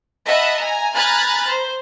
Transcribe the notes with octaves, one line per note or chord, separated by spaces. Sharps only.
D#5 E5 F#5 A5 B5
G#5 A#5
G#5 A#5 B5 F6 F#6 A6
C5